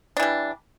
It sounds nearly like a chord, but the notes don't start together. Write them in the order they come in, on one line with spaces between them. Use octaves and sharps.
D4 E3 G3